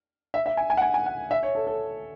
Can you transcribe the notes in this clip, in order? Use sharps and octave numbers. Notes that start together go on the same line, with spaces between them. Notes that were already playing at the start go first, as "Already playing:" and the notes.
E5
E5
G#5
G#5
F#5
G#5
G#5
F#5
E5
C#5
A4
A4